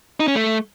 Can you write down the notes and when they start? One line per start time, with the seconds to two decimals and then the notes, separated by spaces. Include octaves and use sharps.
0.20 D#4
0.28 C#4
0.35 A3